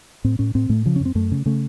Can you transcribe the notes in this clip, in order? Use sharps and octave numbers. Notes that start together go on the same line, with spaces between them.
A2 C4
A2 C#4
A2 C4
A2 A3
C#3 F3
C#4
F#2
C4
F#2 A3
C#3
C#3 A3